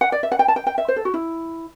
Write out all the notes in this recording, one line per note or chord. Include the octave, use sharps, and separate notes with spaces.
F#5
D5
E5
F#5
G5
A5
G5
G5
E5
C5
A4
F#4
E4